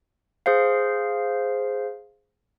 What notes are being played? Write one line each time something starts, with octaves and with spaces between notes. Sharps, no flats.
G#4 C5 F5